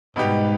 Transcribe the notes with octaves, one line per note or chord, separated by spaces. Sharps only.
G#2 B2 G3 B3 D#4 G4